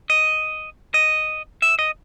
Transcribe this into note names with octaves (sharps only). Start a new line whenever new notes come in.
D#5
D#5
E5
D#5